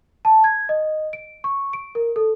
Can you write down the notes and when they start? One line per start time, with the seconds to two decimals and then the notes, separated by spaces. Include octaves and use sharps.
0.25 A5
0.44 G#6
0.69 D#5
1.13 D7
1.44 C#6
1.73 D7
1.95 A#4
2.16 A4